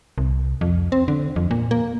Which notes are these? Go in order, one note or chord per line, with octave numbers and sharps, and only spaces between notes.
C2
F2
C4
D3
F2
A#2
A#3